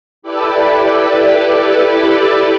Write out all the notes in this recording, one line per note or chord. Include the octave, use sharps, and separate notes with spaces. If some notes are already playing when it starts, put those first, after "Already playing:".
E4 G4 A4 B4 D5